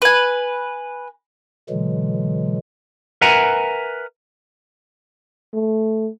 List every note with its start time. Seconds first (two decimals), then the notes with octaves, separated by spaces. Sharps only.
0.02 B4 G#5
1.69 B2 D3 E3 F#3 G#3
3.21 A#4 B4 E5 F#5 G#5 A#5
5.54 A3